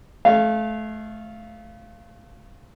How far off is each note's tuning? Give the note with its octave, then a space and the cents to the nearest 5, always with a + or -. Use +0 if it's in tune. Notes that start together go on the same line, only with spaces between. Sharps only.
A3 -30 C#5 +0 F5 -15